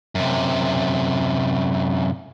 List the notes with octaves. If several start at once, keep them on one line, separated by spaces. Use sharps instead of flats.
F#2 C3